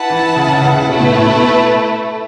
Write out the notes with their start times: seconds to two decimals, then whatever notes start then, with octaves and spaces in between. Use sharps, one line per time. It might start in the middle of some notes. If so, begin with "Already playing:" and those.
Already playing: E4 B4 F#5 A5
0.10 E3
0.36 C#3
0.48 C#3
0.61 C#3
0.75 C#3
0.88 B2 A3 E4 B4
1.00 A2
1.13 A2
1.26 B2